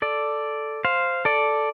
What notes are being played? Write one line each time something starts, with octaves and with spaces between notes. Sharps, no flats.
A4 D5
C5 F5
A4 D5